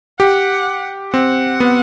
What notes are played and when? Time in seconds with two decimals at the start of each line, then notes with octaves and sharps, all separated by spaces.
0.19 G4 F#5
1.13 C4 F#5
1.60 B3